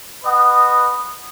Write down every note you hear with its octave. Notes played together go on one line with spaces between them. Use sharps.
B4 D#5 F#5 D#6